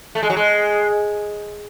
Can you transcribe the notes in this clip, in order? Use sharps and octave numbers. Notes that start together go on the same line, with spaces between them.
A3
G#3
F#3
G#3